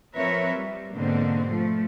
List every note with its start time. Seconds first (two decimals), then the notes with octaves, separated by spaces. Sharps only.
0.16 F3 C4 A#4 B4 C#5 E5
0.53 G3
0.94 G#2 B2 D3 A#3 C4 C5
1.48 F3 A3